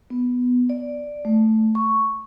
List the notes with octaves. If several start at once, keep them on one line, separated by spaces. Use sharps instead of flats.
B3
D5
A3
C#6